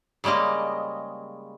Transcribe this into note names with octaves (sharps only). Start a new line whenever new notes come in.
C#3 G3 G#3 A#3 D#5